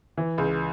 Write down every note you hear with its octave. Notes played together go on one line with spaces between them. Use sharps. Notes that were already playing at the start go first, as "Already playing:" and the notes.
E3
C#2